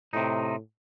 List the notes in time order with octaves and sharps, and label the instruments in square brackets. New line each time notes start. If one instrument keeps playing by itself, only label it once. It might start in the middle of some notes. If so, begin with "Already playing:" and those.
[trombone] A2 [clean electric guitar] C3 D#4